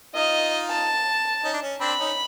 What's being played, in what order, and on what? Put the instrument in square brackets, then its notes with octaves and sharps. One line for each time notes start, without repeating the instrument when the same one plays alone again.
[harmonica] D#4 F4 [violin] D#5
[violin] A5
[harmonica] C#4 D#4
D4
C#4
[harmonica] C4 D4 [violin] B5
[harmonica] C#4 D#4